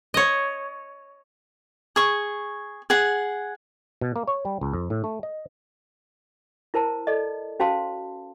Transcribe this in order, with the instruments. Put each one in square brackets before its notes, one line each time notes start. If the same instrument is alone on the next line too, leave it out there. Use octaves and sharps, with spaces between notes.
[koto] C#5 D#5
[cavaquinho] G#4 C#6
G#4 F#5
[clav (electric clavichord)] B2
A#3
C#5
G3
C#2
F2
A2
A3
D#5
[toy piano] E4 A#4 C5 A5 A#5
A4 D5 D#5
C#4 F#4 C5 F5 A5 C6